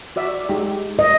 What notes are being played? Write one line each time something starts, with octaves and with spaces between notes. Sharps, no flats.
F#4 D5 E5
G#3 D#4 G4
D#5